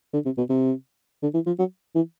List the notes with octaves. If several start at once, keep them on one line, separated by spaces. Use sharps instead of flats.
D3
C3
B2
C3
D3
E3
F3
F#3
E3